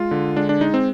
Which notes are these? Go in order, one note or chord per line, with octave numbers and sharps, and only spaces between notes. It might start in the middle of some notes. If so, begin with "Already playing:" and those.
Already playing: G#3 F4
D3
G#3 D4
D4
G#3 D#4
C4